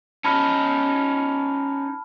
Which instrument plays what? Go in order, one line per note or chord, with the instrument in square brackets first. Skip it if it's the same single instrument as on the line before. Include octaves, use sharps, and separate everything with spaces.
[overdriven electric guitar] C#4 D#4 [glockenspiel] A5 B5 F6